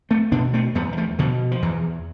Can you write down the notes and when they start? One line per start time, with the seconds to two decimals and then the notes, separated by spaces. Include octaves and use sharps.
0.11 A3 C4
0.32 B2 B3 D4
0.54 A3 C4
0.75 E2 G3 B3
0.93 G3
0.97 F3 A3
1.19 B2 D3 F3
1.51 F3
1.62 E2 E3